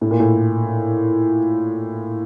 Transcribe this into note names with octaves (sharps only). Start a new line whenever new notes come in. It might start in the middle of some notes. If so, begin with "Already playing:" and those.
A2
A#2
A2